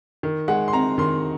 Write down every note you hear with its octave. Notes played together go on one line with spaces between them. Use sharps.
D#3
G#3 F#5
C6
C4 A#5
D#3 C6